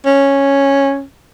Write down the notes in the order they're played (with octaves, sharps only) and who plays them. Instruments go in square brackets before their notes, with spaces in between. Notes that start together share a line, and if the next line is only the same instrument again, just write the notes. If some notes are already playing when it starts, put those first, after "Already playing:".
[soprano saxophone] C#4